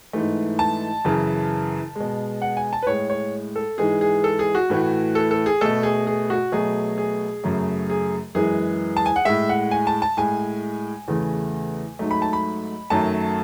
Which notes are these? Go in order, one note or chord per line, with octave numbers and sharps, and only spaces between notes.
G#2 E3 A3
A5
F#2 C#3 E3
B2 G#3
F#5
G#5
A5
B4
A2 G#3 C#5
C#5
A4
G#2 E3 G#3 G#4
G#4
A4
G#4
F#4
A2 E3 A3
A4
A4
G#4
B2 A3 A4
G#4
G#4
F#4
B2 F#3 A3 G#4
G#4
F#2 C#3 F#3 A3
G#4
F#2 E3 G#3 G#4
A5
G#5
F#5
A2 G#3 E5
F#5
G#5
A5
A5
A2 G#3 G#5
E2 C#3 E3 A3
G#2 F#3 A3
B5
A5
B5
F#2 D#3 F#3 A3 A5